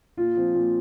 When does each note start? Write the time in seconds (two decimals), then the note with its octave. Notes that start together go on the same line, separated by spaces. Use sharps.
0.17 A#2 F4
0.35 F3 C4
0.54 A#2